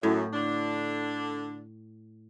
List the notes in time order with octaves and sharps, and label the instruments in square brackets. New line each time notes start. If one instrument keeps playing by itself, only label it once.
[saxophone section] F#2 [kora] A2
[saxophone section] D3 D4